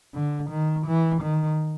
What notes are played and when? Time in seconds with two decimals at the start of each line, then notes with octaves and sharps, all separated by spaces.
0.14 D3
0.50 D#3
0.87 E3
1.22 D#3